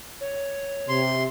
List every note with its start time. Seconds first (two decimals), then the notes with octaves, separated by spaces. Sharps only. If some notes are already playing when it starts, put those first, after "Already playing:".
0.21 C#5
0.89 C3 C6